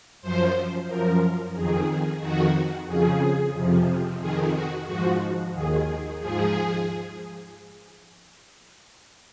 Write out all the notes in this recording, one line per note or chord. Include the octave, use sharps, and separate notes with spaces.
F#2 F3 C5
F#2 F3 A#4
F2 D#3 G#4
F2 D#3 F#4
F2 C#3 F3 G#4
F2 C3 F3
F2 D#3 G#4
F#4
G#2 F3 F#4
D#2 D#3 G#4
G#2 F3 G#4